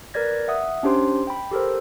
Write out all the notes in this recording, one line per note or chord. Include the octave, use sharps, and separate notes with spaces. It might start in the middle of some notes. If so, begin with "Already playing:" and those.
A#4 B4 D5 G#6 A#6
E5 F#5 D#6
C#4 D4 G4 C5 C6
G5 B5
G4 A4 A#4 C5